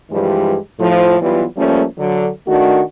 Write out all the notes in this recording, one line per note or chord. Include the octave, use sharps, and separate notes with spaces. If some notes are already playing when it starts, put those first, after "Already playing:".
G2 E3 F3 G3 G#3
A2 F3
E3 F#3 G3 B3 F4
F3 G3 A3 A#3 C#4
D3 F#3
D#3 A3 D4 F#4